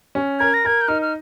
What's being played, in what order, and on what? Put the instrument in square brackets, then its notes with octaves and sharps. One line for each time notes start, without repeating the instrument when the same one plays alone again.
[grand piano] C#4
[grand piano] A#4 [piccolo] G#6
[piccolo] A#6
[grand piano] A#4 [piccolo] G#6
[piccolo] G6
[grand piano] D#4 [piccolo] F6
[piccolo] F6